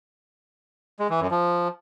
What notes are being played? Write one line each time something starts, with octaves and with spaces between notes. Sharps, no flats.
G#3
E3
F#2
F3